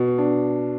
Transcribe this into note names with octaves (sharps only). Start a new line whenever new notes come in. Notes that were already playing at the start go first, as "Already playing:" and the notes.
Already playing: B2
D4